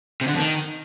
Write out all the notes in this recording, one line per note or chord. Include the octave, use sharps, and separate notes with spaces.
C3
D3
F2
D#3